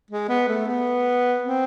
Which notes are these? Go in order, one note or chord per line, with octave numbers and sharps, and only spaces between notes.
G#3
B3
A3
B3
C4